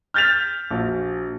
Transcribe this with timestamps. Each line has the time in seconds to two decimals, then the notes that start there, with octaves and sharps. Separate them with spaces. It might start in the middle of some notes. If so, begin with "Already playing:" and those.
0.14 F6 G6 A6 B6 F7
0.70 A#1 F#4